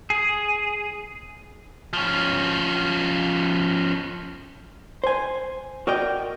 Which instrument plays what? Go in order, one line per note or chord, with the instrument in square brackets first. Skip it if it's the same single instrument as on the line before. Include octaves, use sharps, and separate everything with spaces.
[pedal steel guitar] G#4
[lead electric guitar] F3 C#4
[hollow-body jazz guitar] C5 G#5
F#4 A#4 D5 D#5 G5